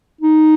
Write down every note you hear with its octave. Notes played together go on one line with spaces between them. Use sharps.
D#4